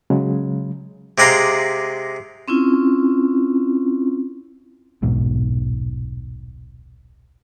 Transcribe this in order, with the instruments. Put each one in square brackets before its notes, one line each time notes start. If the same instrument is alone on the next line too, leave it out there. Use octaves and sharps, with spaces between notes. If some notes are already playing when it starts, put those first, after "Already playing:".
[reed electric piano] C#3 F#3 G#3
[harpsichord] C3 G#3 D5 D#5 F5 A#5
[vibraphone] C4 C#4 E4 F4
[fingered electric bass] D#1 B1 G#2 B2